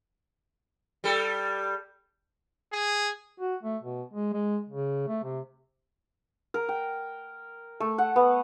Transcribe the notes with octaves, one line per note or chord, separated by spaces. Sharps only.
G3 A4
G#4
F#4
A3
B2
G#3
G#3
C#3
A3
C3
A#4
G5
A3
F#5
B3